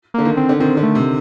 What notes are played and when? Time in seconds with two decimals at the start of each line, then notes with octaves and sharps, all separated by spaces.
0.14 D3 A#3
0.25 D#3
0.37 C4
0.49 D3
0.60 D#3 C4
0.77 D3
0.83 A3
0.95 C3